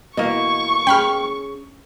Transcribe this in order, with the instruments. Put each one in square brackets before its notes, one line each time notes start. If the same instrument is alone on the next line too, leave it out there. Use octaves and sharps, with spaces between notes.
[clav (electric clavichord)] B2 E3 A#3 [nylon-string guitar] E4 D#5 [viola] C#6
[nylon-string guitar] C#4 G#4 [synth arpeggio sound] G5 B5 F6